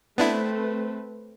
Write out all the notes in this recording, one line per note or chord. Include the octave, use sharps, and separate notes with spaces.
A3 B3 C4 D4 E4 B4